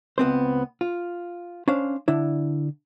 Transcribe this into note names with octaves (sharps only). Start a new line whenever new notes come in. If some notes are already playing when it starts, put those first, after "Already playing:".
C#2 B3 C4 C5
F4
C#4 D4 C5 F5
D3 D4 E4